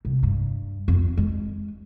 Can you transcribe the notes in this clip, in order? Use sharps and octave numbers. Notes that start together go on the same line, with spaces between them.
C2
G2
F2
G#3